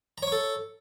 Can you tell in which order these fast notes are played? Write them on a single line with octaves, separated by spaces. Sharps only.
A#5 C#5 C#6 A4